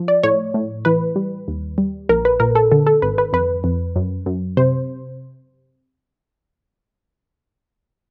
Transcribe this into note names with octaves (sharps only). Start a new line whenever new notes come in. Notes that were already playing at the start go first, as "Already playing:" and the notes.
Already playing: F3
D5
A2 C#5
A2
E3 B4
G3
D#2
G3
A#1 A#4
B4
A#2 A#4
A4
D3 A4
A4
G#1 B4
B4
F2 B4
F2
F#2
F#2
C3 C5